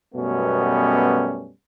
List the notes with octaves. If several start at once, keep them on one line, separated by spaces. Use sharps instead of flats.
F#2 B2 G3 A3 B3 C#4